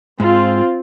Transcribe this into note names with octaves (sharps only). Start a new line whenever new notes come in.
G#2 C4 F4